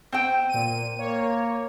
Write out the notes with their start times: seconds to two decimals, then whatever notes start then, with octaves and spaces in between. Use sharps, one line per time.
0.12 C4 C5 G5
0.49 A#2 D#7
0.99 A#3 C#5